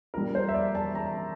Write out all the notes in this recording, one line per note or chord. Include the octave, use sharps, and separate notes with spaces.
A#2 G3 A#4
C5
E5
D5
A5
A#5